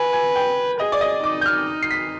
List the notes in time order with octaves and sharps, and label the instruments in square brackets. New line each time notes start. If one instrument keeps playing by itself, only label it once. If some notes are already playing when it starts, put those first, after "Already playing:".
Already playing: [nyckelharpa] B4 [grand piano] G#5
[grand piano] G#5
G5
[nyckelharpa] G#4 [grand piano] D#5
[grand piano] D5
D#5
[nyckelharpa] D#4 [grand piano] D6
[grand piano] G6
F6
C7
B6